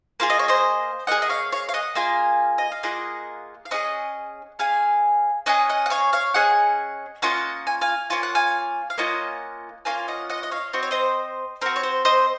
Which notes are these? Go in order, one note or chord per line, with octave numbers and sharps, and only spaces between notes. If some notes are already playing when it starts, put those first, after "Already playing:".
A#3 F4 G#4 F5
D#5
C#5
C5 D#5
A#3 F4 G#4 D#5 F#5
D#5
C#5 F5
C#5 F5
F5
D#5 F#5
A#3 F4 G#4 F5 G#5
D#5
F5
A#3 F4 G#4 D#5 F#5
F5
C#4 G#4 D#5 F#5
C#4 G#4 F5 G#5
C#4 G#4 D#5 F#5
D#5 F#5
F#5
C#5 F5
C#5 F5
C#4 G#4 D#5 F#5
A#3 C#4 F4 D#5 F#5
G#5
F5 G#5
A#3 C#4 F4 G#5
F#5
F5 G#5
F5
A#3 C#4 F4 D#5 F#5
A#3 C#4 F4 F5 G#5
D#5 F#5
D#5 F#5
D#5
C#5 F5
C4 F#4 D#5
C#5
C5 D#5
C4 F#4 A#4
C#5
C5
C5 D#5